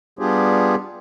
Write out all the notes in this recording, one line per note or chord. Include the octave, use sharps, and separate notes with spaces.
G3 B3 D4 F4 G4 G#4